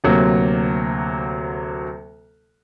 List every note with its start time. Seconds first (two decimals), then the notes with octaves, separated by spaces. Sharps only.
0.04 D2 C3 F#3 A#3